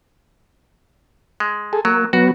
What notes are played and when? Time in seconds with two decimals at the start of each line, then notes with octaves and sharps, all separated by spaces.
1.40 G#3
1.73 G#4 A4
1.85 F#3 A#3
2.13 F#3 B3 F#4